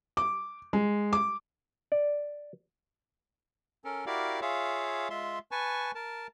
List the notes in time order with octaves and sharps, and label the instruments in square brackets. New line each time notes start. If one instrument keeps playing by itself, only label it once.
[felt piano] D6
G#3
D6
[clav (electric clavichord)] D5
[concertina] C#4 A4 A#4
E4 F#4 G4 A#4 D5 F5
F4 G#4 C#5 E5 F5
G#3 F4 E5 C6
B4 G#5 A5 C#6
A#4 A5